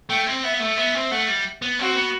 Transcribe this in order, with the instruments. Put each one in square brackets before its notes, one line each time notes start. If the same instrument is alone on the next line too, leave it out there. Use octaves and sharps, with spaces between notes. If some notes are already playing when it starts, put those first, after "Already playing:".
[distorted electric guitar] A3 [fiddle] G5
[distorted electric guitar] C4
[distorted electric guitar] B3 [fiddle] E5
[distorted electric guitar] A3
[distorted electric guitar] B3 [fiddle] E5
[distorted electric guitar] C4
[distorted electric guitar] A3 [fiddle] F#5
[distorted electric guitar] G3
B3
[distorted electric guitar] C4 [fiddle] F#4
[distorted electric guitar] B3